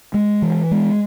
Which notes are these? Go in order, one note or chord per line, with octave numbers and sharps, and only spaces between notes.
G#3
E3
G#3